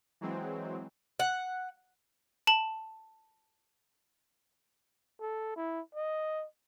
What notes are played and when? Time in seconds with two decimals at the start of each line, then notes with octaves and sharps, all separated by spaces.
0.21 E3 F#3 G#3 C4
1.19 F#5
2.47 A5 F#7
5.20 A4
5.56 E4
5.95 D#5